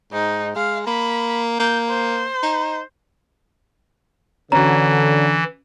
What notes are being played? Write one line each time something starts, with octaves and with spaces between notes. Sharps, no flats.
G#2 D#4
G#3 F5
A#3 B5
A#3 G6
C5
D#4
D3 E3 C#4 F#4 A#5